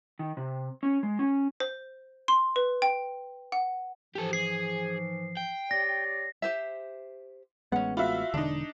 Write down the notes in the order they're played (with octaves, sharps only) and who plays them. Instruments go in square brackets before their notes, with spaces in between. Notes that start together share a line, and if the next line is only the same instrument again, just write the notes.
[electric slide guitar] D#3
C3
C#4
G#3
C#4
[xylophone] C5
C6
B4
G5
F#5
[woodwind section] G#2 E3 F3 [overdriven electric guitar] G4 A4
[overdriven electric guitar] G#4 [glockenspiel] C7
[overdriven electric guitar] G5
[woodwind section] G4 C#5 D5 [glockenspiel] A#6
[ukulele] G4 C5 E5
[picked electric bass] A1 G#3 B3 [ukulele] C#4 F#5
[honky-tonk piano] F4 F#4 E5 [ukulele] B5
[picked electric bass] E1 D3 [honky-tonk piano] D4 D#4